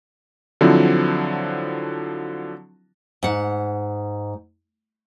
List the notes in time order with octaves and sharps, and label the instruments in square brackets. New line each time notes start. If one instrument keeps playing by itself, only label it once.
[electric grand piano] D3 F3 F#3 C4 E4
[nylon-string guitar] G#2 F#5